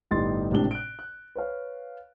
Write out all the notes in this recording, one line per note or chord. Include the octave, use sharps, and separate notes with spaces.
G1 A2 D#4 G4 C6 A6
G#1 A2 C3 G3 D4 G7
F#6 D7
F#6
B4 C#5 F5